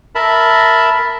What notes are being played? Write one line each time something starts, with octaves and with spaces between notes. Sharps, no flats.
A#4 E5 A5 B5